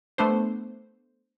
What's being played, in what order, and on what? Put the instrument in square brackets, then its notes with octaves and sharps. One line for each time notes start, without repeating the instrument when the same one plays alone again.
[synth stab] A3 B3 D4 C5